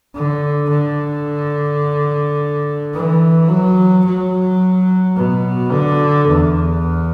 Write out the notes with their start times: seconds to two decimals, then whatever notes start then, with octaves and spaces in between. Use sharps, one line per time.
0.15 D3
0.70 D3
2.93 E3
3.49 F#3
4.05 F#3
5.16 B2
5.72 D3
6.28 E2